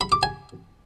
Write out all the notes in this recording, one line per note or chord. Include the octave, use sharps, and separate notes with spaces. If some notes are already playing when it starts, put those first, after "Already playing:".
B5
D6
G#5